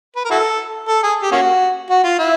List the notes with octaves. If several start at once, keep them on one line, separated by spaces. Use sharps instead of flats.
B4
A#4
E4 F#4 A4
A4
G#4
G4
A#3 C#4 F#4
F#4
F4
E4